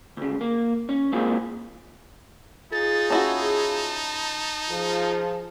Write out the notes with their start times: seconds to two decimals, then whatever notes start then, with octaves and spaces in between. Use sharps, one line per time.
0.17 D2 C#3
0.41 A#3
0.89 C#4
1.12 C#2 A#3 C4 F4 G#4
2.72 D#4 F4 G#4 A6
3.10 C#4 E4 F#4 A5
4.70 F3 F4 G#4